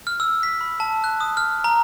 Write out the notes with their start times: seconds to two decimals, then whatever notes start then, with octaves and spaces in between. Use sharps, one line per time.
0.07 F6
0.20 E6
0.43 B6
0.61 B5
0.80 A5
1.04 F#6
1.20 D#6
1.37 F6
1.64 A#5